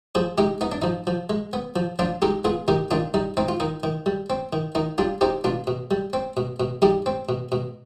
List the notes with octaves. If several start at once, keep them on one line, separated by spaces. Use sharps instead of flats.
F3 G#4 C5
G#3 D#4 G4
B3 D#4
D4
F3 D#4
F3
G#3
B3
F3
F3 D4 F4
G#3 D#4 G4
B3 F4 G#4
D#3 D#4 G4
D#3 D4 F4
G3 D#4
C4 D#4
F4
D#3 D#4
D#3
G3
C4
D#3
D#3 D#4
G3 D4 F4
C4 D#4 G4
B2 D4 F4
B2
G3
C4
B2
B2
G3 D#4 G4
C4
B2
B2